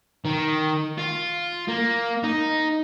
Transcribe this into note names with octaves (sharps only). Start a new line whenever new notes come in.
D#3
F4
A#3
D#4